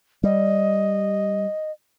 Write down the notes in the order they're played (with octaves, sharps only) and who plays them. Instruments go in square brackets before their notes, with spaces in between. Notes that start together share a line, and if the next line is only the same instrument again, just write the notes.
[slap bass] G3 [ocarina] D#5